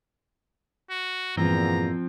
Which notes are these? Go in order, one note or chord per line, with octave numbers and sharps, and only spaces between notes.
F#4
E2 G2 A#2 E3 F3 C4 A#5